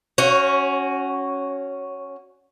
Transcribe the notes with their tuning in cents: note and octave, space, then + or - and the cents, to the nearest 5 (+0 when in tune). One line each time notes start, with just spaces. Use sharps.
C#4 +0 F#4 +10 C#5 -30